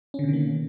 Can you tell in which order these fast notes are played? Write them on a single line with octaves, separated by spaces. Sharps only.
C#4 D3 B2 D#3 A#3